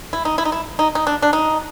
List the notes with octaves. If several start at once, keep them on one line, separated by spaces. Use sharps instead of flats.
E4
D#4
E4
D#4
E4
D#4
D#4
D4
D4
D#4